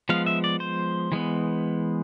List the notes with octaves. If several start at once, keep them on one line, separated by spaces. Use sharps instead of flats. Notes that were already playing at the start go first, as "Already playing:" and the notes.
F3 G#3 B3 F5
E5
D5
C5
E3 G#3 B3